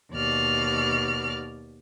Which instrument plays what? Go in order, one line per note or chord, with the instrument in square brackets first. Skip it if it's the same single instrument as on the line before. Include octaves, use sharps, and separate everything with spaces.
[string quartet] D#2 B2 D5 F6